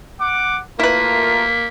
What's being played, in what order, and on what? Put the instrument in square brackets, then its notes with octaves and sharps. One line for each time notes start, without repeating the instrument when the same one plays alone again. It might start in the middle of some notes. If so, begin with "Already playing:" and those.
[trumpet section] F#5 D6
[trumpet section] A3 F4 A#4 [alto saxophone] A#3 [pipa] E4 B4 [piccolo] B6